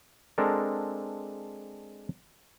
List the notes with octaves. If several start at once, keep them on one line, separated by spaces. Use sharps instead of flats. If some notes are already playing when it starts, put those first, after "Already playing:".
G#3 C4 D4 A4 A#4